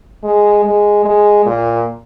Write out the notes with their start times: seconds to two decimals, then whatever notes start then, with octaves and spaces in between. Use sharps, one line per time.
0.24 G#3
0.64 G#3
1.05 G#3
1.46 A#2